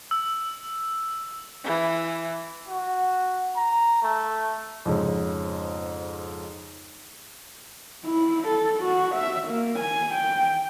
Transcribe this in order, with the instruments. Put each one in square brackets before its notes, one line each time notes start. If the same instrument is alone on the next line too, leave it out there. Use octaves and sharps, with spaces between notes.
[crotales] E6
[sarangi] E3
[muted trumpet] F#4
A#5
A3
[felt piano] F2 G#2 C#3
[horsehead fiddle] E4
A4
F#4
E5
A#3
G#5
G5